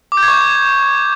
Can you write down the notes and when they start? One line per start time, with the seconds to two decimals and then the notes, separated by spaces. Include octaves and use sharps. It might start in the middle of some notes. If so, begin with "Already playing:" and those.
0.12 D6
0.17 G6
0.23 G#6
0.28 C#6
0.34 G6